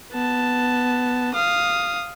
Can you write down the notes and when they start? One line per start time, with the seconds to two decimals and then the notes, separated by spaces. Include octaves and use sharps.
0.13 B3 A5
1.34 F5 D#6